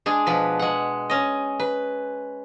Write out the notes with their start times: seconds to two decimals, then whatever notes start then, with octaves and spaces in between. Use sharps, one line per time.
0.06 G#3 D4 G#4
0.27 B2 F3 B4
0.59 G#3 F#5
1.10 C#4 D#5
1.60 B4